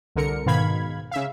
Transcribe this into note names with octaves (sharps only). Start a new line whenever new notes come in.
C2 D3 A#4 C#7
G#2 B2 D#3 F5 B5 G#6
C#3 E5 F5